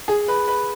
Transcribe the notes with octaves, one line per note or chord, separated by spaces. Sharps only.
G#4
B4
B4